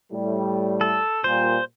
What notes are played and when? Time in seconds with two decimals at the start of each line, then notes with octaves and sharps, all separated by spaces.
0.12 A2 G3
0.81 A4
1.24 A#2 G3 C5